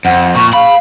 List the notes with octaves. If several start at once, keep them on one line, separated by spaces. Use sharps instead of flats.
F2 F#5
A#2 C#6
F5 B5